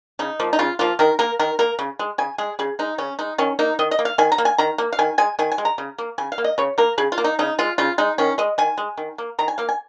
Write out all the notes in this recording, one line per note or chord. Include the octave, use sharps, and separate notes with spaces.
C#3 D#4
F3 A#3
D#4
C#3 F4
F3 A#3 F4
D#3 A#4
A#3 A#4
D#3 A#4
A#3 A#4
C#3
G#3
C#3 G#5
G#3 G#4
C#3 G#4
G#3 D#4
C#3 C#4
G#3 D#4
D#3 C#4
A#3 D#4
D#3 D#5
D#5
A#3
F5
D#3 G#5
A#5
A#3
G#5
D#3 A#5
A#3
F5
D#3 G#5
G#3 G#5
D#3 G#5
G#5
G#3
A#5
C#3
A#3
C#3 G#5
F5
A#3
D#5
C#3 C#5
A#3 A#4
C#3 G#4
F4
A#3
D#4
C#3 D#4
G#3 F4
C#3 F4
G#3 D#4
D#3 C#4
G#3 D#5
D#3 G#5
G#3
D#3
A#3
D#3 A#5
G#5
A#3 F5
G#5